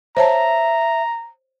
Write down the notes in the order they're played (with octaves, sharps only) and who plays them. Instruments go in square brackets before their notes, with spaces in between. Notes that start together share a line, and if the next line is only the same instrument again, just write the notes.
[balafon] C5 C#5 A5 [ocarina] E5 [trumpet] A#5